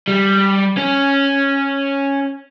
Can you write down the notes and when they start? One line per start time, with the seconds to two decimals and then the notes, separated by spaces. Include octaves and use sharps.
0.08 G3
0.78 C#4